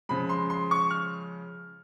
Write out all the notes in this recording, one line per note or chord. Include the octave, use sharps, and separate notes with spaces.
C#3 F3 G#3 B5
C6
C6
C#6
F6